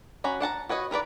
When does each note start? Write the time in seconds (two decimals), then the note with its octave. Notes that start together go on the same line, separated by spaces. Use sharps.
0.24 C#4 F#4 A#5 B5
0.40 D4 F#5 A5 A#5
0.69 F#4 B4 C#5 D#5
0.91 D#4 A#4 B4 D5